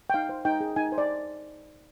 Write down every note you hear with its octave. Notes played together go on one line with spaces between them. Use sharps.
G5
D#4 F5
C5
D#4 G5
G#4
D#4 G#5
C5
D5